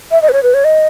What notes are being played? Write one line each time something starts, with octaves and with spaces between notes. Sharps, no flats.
E5
D#5
B4
C#5
B4
C#5
D#5